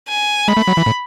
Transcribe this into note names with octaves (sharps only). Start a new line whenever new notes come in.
G#5
G#3 B5
A3
F#3
E3
A2